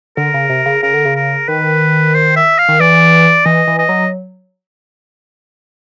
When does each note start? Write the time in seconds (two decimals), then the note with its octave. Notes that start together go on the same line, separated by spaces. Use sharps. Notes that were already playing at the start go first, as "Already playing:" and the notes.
0.17 D3 A#4
0.34 C#3
0.49 C3
0.66 C#3
0.82 C#3 A#4
0.94 D3
1.05 C#3
1.16 A#4
1.48 D#3 B4
2.14 C5
2.36 E5
2.58 F5
2.69 D#3
2.80 E3 D5
3.45 E3 D#5
3.67 E3
3.79 D#5
3.89 F#3